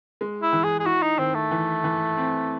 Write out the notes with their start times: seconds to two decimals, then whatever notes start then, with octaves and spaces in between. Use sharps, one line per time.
0.21 G#3
0.42 E4
0.53 E3
0.64 G#4
0.80 G#4
0.85 E4 F#4
1.02 D#4
1.18 D#3 C4
1.34 A3
1.51 E3
1.84 E3
2.17 C4